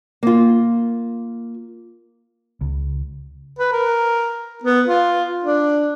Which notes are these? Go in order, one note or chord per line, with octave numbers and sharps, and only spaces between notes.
A#3 F4
C#2
B4
A#4
B3
F4
D4